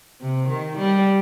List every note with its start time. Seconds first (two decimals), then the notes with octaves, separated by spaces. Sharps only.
0.21 C3
0.49 D#3
0.79 G3